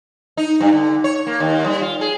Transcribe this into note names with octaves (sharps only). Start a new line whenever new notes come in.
D#4
G2
D3
C#5
A#3
D#2
G3
F4
G#4